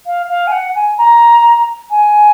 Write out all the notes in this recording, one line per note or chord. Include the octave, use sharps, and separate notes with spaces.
F5
F5
G#5
F#5
G#5
A#5
G#5